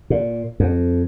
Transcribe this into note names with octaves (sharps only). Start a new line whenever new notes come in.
A#2
F2